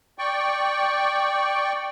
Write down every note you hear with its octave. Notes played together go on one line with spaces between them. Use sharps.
D5 G5 C#6